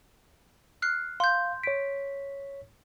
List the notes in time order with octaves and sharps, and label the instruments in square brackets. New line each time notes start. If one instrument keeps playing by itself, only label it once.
[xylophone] F6 F#6 C7
[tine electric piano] F5 [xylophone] C6 G6
[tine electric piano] C#5 B6 [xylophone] D7